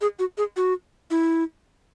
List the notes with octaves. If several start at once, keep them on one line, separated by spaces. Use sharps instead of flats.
G#4
F#4
G#4
F#4
E4